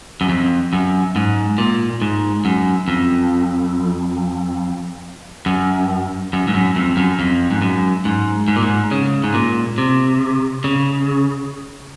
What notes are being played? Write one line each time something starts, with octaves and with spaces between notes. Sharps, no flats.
F#2
F2
F#2
G#2
A#2
G#2
F#2
F2
F#2
F#2
G#2
F#2
F2
F#2
F2
G#2
F#2
G#2
G#2
A#2
G#2
C#3
G#2
A#2
C3
C#3